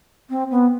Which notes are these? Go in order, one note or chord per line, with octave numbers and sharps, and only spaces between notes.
C4
B3